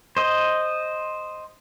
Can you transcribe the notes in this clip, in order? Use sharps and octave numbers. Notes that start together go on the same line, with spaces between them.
C5 D#5